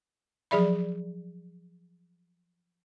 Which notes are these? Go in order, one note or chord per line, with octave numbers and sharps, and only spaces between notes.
F3 F#3 G#4 D5 E5 B5